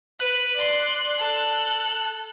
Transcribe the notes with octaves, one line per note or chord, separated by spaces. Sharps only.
B4 F#6
D5 C6
A4